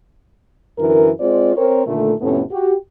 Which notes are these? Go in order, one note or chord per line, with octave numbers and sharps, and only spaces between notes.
F#2 D3 E3 A#4
G#3 C4 F4 C5 D5
C4 A#4 C#5
A#2 D3 D#3 A3
F2 A2 C3 A3 B3 C#4
F#4 G4